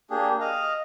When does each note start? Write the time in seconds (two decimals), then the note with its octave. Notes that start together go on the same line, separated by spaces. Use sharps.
0.11 A#3 D4 G4 G#4
0.40 D#5 F5